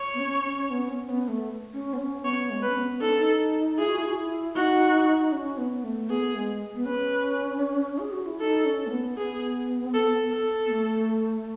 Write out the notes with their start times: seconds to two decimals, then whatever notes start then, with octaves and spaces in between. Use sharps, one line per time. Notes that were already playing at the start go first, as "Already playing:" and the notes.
Already playing: C#5
0.14 B3
0.19 C#4
0.45 C#4
0.71 B3
0.90 C#4
1.09 B3
1.28 A3
1.73 C#4
1.94 B3
1.99 C#4
2.24 B3 C#5
2.50 G#3
2.63 B4
2.68 C#4
2.76 B3
3.01 D#4 A4
3.08 C#4
3.16 D#4
3.79 E4 G#4
3.89 F#4
3.97 E4
4.07 F#4
4.17 E4
4.55 D#4 F#4
5.32 C#4
5.58 B3
5.84 A3
6.09 B3 G#4
6.35 G#3
6.75 B3
6.86 C#4 B4
7.99 G#4
8.12 F#4
8.26 E4
8.40 D#4 A4
8.65 C#4
8.87 A3
8.91 B3
9.18 B3 G#4
9.94 A4
10.33 A4
10.67 B3
10.71 A3